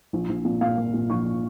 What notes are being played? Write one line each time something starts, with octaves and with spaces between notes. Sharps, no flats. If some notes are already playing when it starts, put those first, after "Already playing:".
A#1
A#1
A#2
A#2 F5
A#3
A#2
A#1 C#6